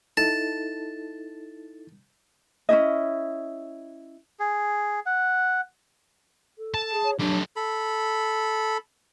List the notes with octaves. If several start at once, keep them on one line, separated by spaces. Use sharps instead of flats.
D#4 E4 A4 A5
C#4 D4 E4 D#5
G#4
F#5
A4
A5
G#4
C#5
F#3 A3 D4 G4
A4 B5